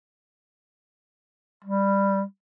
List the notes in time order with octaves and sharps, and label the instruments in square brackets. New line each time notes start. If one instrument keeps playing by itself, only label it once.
[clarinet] G3